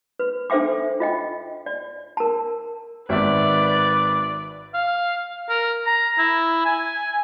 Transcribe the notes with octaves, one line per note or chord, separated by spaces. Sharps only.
B4
D4 A4 C5 E5 G5 D6
F4 D#5 G5
D5
A#4 A5
G#1 B4 D5 E5
F5
A#4
A#5
E4
G#5